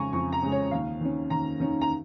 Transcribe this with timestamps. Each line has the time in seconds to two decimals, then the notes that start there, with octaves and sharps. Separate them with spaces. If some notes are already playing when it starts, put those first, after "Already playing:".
Already playing: F2 C#3 G#3 G#5 A#5 C#6
0.13 F2 C#6
0.32 A#5
0.42 C#3 G#3
0.52 C#5
0.71 D#2 F5
1.01 D#3 C#4
1.30 D#2 A#5
1.60 D#3 C#4
1.81 A#5